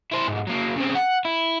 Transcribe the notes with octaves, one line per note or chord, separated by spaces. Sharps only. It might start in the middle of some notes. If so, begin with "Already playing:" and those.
E4 C5
B1 G#2
F#3 A#3
C#3 C4
F#5
E4